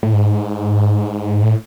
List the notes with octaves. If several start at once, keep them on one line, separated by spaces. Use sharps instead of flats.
A2
G#2
A2